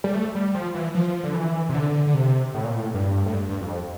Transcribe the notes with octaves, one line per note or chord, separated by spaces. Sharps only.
G3
A3
G3
F3
E3
F3
D3
E3
C3
D3
D3
C3
A2
A#2
A2
G2
A2
G2
G2
F2